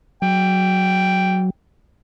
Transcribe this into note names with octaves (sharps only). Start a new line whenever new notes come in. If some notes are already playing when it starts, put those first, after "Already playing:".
F#3 G5